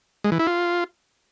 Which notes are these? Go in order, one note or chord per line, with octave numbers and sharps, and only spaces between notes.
G#3
E3
E4
F4